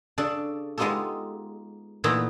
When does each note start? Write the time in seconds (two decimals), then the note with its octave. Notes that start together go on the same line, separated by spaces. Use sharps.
0.18 C#3 D4 A4 D5
0.78 G#3 B3 D#4 F4 G4 A4
2.04 A#2 E3 A3 B3 D#4 E4